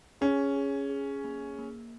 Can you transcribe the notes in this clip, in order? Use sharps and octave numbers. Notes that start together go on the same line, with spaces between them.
C#4 G#4
G#4
G#4
A#3
A#3